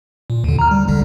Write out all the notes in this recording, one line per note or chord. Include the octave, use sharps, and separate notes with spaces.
A#2
D#2 D3
A#5 F6
G3
B1 D3 G3